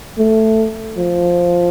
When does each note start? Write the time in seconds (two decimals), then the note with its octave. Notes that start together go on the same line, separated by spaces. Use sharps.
0.19 A3
0.98 F3